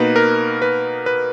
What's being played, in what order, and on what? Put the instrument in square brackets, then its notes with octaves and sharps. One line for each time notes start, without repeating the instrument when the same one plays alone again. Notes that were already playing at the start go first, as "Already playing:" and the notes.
Already playing: [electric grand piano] B2 A#3 D#4 B4
A#4
B4
B4